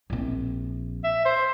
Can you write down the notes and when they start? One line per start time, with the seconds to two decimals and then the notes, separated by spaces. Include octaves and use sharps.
0.10 A#1 C4
1.04 E5
1.25 C5